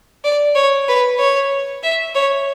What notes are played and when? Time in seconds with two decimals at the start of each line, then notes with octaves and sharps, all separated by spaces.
0.24 D5
0.55 C#5
0.88 B4
1.18 C#5
1.83 E5
2.14 C#5